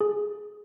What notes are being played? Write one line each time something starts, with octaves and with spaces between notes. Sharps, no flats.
G#4